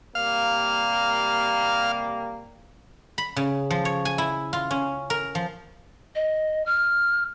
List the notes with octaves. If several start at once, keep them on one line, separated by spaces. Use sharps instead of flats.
C3 G3 A#3 F5
B5
C#3
F3
C#5
G#5
E4
F4
C#4
A#4
F3
D#5
F6